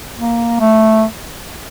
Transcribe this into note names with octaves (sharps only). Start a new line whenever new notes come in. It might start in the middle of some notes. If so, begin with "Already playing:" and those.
A#3
A3